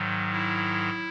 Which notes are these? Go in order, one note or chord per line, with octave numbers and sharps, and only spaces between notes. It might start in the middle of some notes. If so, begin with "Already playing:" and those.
Already playing: G#2 D#3 F#3
E4